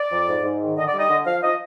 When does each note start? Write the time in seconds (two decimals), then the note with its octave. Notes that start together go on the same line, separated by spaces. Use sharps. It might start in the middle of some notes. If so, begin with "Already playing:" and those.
Already playing: D5
0.11 F2
0.27 G#2
0.43 G#2
0.60 D#3
0.76 D3 D#5
0.87 D5
0.93 G3 D#5
1.09 D3
1.26 F3 F5
1.43 F3 D#5